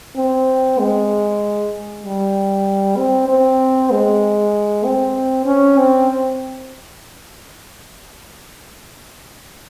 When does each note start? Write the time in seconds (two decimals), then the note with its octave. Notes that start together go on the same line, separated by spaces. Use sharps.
0.16 C4
0.79 G#3
2.03 G3
2.97 C4
3.29 C4
3.91 G#3
4.85 C4
5.46 C#4
5.78 C4